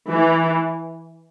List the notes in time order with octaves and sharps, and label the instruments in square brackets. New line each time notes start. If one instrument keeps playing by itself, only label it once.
[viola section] E3